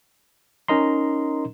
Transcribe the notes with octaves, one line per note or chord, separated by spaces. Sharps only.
C#4 D#4 A#4 D#5 A#5 C6